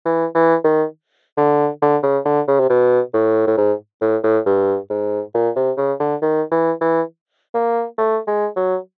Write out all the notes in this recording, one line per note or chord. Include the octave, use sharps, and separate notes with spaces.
E3
E3
D#3
D3
D3
C#3
D3
C#3
C3
B2
A2
A2
G#2
A2
A2
G2
G#2
A#2
C3
C#3
D3
D#3
E3
E3
A#3
A3
G#3
F#3